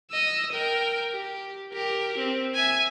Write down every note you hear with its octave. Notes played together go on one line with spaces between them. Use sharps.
D#5 E6
A#4 G5
G4
G4 A#4
C4
E5 G#5